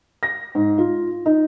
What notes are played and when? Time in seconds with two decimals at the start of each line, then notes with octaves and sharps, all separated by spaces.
0.23 A#6
0.55 G#2
0.78 F4
1.26 D#4